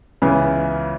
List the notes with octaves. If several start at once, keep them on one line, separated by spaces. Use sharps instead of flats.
C#2 C#3 E3 B3